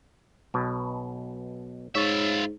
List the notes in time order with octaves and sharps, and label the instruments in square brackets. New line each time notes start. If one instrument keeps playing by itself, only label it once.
[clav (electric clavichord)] B1 B2
[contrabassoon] G#2 [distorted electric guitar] F4 E5 [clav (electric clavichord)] C#5